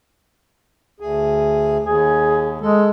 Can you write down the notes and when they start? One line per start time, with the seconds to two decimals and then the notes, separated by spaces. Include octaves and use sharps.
1.00 D2 G#4
1.84 D#2 G#4
2.62 G#3 A4